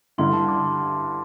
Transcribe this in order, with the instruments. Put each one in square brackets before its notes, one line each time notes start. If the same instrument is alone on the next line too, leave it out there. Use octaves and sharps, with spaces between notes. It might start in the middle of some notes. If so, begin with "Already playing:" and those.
[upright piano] G2 D3 G3 E4 [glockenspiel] C6
[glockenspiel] A5
D6